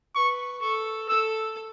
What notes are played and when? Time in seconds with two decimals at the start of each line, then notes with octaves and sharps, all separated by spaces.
0.15 B4 C#6
0.62 A4 C#6
1.09 A4 E6